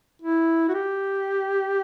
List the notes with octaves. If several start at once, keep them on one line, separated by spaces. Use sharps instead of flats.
E4
F#4
G4